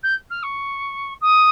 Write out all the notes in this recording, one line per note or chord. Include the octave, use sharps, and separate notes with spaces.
G6
F6
C#6
D#6